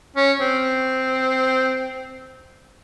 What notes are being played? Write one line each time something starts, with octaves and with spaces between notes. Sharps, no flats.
C#4
C4